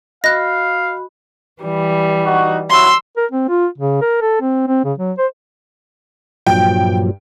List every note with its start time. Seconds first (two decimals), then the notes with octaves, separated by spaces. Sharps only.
0.24 F#4 D#5 F5 B5 F#6 A#6
1.62 E3 G3
2.25 D#4 F#4
2.70 F#3 E4 F#4 C6 E6
3.17 A#4
3.31 C4
3.49 F4
3.78 C#3
4.01 A#4
4.21 A4
4.41 C4
4.67 C4
4.84 C#3
4.98 F#3
5.18 C5
6.47 G2 A#2 F3 F#3 G5